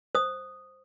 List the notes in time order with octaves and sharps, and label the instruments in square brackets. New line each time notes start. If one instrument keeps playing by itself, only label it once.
[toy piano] C5 D#6